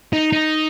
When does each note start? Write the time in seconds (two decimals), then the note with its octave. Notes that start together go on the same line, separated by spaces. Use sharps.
0.13 D#4
0.33 D#4